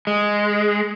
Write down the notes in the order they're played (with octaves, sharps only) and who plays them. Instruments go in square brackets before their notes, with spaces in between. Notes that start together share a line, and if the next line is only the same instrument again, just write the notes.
[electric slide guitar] G#3